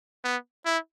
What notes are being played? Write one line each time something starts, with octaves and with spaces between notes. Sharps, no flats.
B3
E4